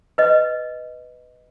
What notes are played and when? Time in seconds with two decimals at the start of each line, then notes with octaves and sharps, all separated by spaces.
0.18 B4 D#5